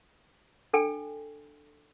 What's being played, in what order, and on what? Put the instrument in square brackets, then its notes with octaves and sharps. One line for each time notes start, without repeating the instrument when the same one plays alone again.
[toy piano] D4 A4 G5 G#5